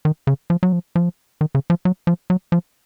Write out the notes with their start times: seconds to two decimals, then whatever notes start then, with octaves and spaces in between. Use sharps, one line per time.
0.05 D#3
0.27 C#3
0.50 F3
0.63 F#3
0.72 F3
0.96 F3
1.41 D#3
1.55 C#3
1.70 F3
1.85 F#3
2.07 F3
2.30 F#3
2.52 F3